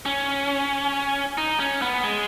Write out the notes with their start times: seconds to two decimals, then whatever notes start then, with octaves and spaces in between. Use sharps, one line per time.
0.06 C#4
1.38 D#4
1.60 C#4
1.82 B3
2.04 G#3